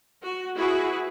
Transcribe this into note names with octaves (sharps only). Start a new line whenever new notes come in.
F#4
E4 F#4 G#4 B4